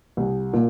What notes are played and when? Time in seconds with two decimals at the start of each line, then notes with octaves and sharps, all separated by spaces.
0.17 C2
0.53 A#2